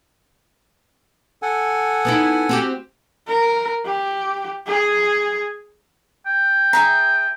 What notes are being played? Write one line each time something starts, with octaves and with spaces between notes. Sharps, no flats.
A4 F#5 G#5
B3 D#4 E4
C4 F#4 G4
A#4
G4
G#4
G5
G#4 E5 A#5